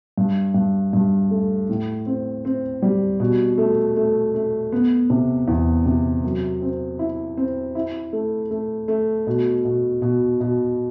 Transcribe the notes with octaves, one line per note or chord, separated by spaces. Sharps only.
G2
G2
G2
A3
A2
C4
C4
G3
B2
A3
A3
A3
B3
C3
E2
C3
F#2
C4
E4
C4
E4
A3
A3
A3
B2
B2
B2
B2